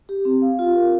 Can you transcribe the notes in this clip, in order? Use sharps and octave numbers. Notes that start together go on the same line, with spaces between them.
G4
C4
F5
F4
A#4